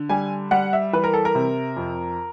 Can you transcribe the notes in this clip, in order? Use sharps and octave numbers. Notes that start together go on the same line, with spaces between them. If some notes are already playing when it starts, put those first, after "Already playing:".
Already playing: D3
G3 G#5
G3 F#5
E5
E3 B4
A#4
A4
A#4
C3
F2